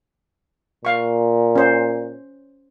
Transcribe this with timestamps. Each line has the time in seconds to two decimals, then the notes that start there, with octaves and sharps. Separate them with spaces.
0.85 A#2 F5 C#6
1.56 C#4 C5